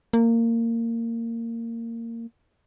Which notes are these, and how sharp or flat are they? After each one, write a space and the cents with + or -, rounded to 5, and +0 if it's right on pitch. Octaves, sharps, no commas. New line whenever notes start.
A#3 -20